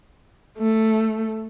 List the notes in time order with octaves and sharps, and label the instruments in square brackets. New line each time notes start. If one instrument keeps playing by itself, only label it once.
[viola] A3